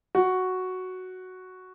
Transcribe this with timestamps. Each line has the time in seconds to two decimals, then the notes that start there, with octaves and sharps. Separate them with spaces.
0.15 F#4